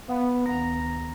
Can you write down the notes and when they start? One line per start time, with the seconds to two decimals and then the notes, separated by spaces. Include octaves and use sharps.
0.08 B3 F5 F#5 D#6
0.46 D2 D#3 B3 A#5